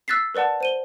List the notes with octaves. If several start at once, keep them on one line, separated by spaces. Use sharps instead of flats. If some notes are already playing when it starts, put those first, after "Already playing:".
E6 F#6 A6 B6 C7
A#4 B4 D5 F#5 A5
C5 D#7 G7